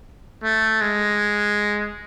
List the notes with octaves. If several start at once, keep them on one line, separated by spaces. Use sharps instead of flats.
A3
G#3